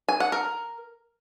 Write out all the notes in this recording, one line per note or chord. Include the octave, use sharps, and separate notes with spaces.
G#5
F#5
A#4